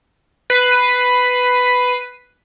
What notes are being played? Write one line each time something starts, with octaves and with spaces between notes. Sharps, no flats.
B4 B6 C7 D#7